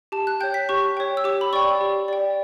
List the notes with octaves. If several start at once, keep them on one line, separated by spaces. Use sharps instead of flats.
G4 A5
F#6
C#5 G5 G6
B6
G4 C#6
C#5 G5
E6
G4 D6
B5
D5 G5 C#6
G4
D5 G5